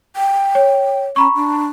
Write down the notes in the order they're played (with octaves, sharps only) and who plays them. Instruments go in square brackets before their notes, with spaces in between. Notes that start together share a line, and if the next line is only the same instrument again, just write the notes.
[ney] G5
[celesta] C#5
[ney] C#4 [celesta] A#5 B5 C#6
[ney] D4